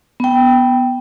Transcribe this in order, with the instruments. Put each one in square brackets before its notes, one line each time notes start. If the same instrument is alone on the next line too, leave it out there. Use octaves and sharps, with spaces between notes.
[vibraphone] B3 G5